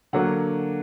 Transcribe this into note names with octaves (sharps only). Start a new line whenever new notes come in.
D3 F#3 A#3 F#5